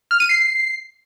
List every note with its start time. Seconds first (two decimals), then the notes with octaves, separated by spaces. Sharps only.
0.11 F6
0.20 D#7
0.29 C7